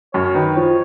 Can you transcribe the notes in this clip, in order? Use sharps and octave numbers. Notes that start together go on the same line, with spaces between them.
F#2 C#5
D#3 B4
F3 C#5